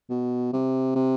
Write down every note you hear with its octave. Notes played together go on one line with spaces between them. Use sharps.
B2
C3
C3